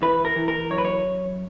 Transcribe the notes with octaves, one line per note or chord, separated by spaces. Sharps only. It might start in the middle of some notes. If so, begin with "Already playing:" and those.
E3 B4
A#4
E3
A#4
F#2 C#5
B4
C#5